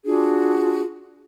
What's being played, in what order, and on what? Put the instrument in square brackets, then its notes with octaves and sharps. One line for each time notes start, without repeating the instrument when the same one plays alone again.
[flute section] D4 F4 F#4 G#4